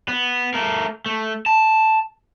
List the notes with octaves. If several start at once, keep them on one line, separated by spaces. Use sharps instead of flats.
B3
A3 A#4
A3
A5